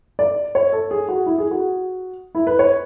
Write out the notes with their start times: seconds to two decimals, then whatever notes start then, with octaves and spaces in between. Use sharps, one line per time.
0.19 D5
0.55 C#5
0.72 A4
0.91 G#4
1.09 F#4
1.26 E4
1.38 G#4
1.51 F#4
2.35 E4
2.47 B4
2.59 C#5